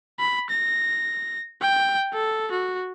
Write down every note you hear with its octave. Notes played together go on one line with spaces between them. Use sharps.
B5
A#6
G5
A4
F#4